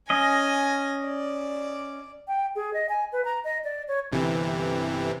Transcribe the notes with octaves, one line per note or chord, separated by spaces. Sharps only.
C#4 D#5 G#5 A#6
D5
G5
G#4
D#5
G#5
B4
A#5
D#5
D5
C#5
G1 C3 E3